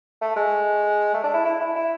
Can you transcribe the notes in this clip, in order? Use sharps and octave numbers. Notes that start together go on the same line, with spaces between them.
A3
G#3
A3
D4
E4
E4
E4
E4